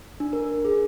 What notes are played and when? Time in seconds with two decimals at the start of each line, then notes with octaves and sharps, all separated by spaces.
0.20 D4
0.33 A#4
0.65 G#4